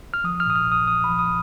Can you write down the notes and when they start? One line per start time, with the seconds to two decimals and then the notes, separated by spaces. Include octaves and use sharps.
0.14 F6
0.24 F3 D#6
0.40 F6
0.46 A#2 D#6
0.56 F6
0.67 A#1 D#6
0.88 A#1 D#6
1.04 F3 B5
1.19 D#6